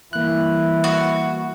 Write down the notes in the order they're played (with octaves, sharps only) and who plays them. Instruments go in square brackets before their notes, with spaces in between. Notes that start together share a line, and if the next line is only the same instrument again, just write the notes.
[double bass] E3 G3 [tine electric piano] A#3 F#6 [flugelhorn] E4
[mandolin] F#4